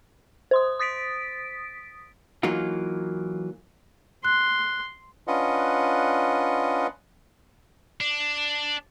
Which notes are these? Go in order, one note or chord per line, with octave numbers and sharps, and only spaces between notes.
C5 C6 D#6
D#6 A6 B6 D7
E3 F#3 A#3 D#4 F4
C6 F#6
C#4 D4 F4 B4 D#5 F#5
D4